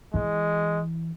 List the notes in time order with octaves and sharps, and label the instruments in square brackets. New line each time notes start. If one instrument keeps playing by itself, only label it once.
[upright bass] E3 [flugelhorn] G#3